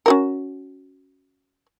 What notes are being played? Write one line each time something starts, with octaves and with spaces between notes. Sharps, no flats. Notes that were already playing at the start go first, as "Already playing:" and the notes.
C#4 F#4 A#4